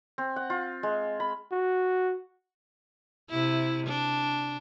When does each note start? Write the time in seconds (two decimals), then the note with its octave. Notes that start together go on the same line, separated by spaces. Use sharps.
0.18 C4
0.36 F#5
0.50 F4
0.83 G#3
1.20 B5
1.52 F#4
3.30 C3 E4
3.88 D4